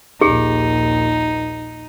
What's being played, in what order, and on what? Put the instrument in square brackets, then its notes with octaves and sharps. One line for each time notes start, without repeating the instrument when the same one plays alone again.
[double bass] A#1 D#2 [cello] D#4 [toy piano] G4 G#4